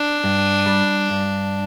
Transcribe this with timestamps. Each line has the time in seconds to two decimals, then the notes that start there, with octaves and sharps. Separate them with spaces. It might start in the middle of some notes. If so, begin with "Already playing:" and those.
Already playing: D4
0.24 G2
0.66 G3
1.10 G2